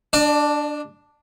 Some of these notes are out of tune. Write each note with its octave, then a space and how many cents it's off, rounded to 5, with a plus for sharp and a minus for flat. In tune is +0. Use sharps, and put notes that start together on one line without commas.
D4 +0 D5 +40